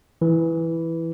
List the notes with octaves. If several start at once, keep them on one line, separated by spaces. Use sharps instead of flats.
E3